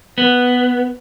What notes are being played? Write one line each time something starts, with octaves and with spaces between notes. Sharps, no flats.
B3